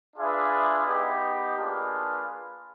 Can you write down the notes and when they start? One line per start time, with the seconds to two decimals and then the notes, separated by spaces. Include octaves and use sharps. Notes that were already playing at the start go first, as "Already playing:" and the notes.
0.16 D4 F4 G#4 B4 E5
0.85 B3 D#4 G4
1.56 A#3 D4 F4 G#4 B4